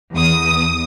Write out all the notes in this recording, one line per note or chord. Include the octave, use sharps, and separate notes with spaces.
E2 D#6